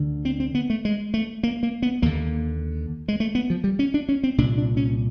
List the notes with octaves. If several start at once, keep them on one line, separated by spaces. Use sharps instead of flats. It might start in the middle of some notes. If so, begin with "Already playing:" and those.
Already playing: D2 D3
C4
C4
B3
A3
G#3
A3
A#3
A#3
B3
D#2 D3 A#3
G#3
A3
B3
F3
G3
C#4
D4
C#4
C4
C2 A#2 D4
D4
C#4